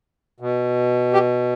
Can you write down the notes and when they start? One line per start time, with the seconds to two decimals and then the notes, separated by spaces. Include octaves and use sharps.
0.40 B2
1.13 G4